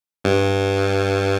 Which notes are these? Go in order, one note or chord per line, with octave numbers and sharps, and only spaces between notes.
G2